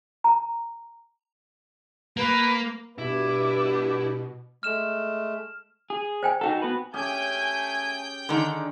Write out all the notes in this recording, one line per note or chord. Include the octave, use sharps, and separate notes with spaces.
A#5
A#3 B4
G2 B2 E4 B4 D6
G#3 A3 F6 E7
G#4
C5 G5 G#5
D#4 F#4 A4 F#5 G5
B3 F#4 B4
A3 C#4 G4 G#4 G5 G#5 G6
D3 D#3 G#3 D4